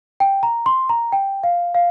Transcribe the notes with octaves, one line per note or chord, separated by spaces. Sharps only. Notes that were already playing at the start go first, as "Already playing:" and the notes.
G5
A#5
C6
A#5
G5
F5
F5